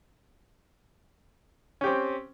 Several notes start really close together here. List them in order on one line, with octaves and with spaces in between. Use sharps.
C#4 G4 C4